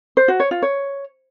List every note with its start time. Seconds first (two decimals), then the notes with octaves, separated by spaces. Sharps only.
0.17 C5
0.28 F#4
0.40 C#5
0.51 F4
0.62 C#5